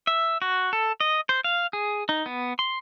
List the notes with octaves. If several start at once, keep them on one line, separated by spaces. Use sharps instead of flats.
E5
F#4
A4
D#5
C5
F5
G#4
D#4
B3
C6